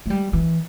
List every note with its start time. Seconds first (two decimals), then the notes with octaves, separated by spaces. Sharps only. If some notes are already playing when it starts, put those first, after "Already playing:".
0.06 A3
0.10 G3
0.33 E3